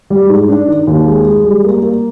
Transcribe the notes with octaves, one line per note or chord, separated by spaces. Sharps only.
G3
G#2
D4
D#3
D#2
G#3
G#3
G3
A#3
A#3